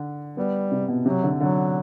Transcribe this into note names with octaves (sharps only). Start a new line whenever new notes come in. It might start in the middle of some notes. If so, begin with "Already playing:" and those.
Already playing: D3
G3 B3
C3
B2
C3 F#3
D3
D3 F#3